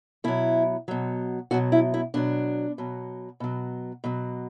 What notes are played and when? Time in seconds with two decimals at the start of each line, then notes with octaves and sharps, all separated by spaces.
0.24 B2 F#3 E4
0.88 B2 F#3
1.51 B2 F#3 F#4
1.72 E4
1.94 E4
2.14 B2 F#3 D4
2.78 B2 F#3
3.40 B2 F#3
4.04 B2 F#3